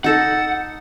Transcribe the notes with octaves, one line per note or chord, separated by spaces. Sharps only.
D#4 A4 F#5